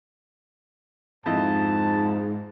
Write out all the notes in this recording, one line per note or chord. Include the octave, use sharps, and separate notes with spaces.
F2 G#2 E4 D#5 A5